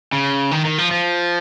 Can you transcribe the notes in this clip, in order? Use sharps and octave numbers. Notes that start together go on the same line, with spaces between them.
C#3
D#3
D#3
F3
F3